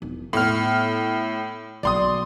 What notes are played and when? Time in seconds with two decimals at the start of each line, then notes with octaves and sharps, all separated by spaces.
0.02 E1 D#4
0.33 A2 B3 F6
1.83 F#1 B1 D5 C6 D#6